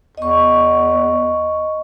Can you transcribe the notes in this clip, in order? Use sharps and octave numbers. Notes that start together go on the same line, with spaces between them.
E2 D#5 C#6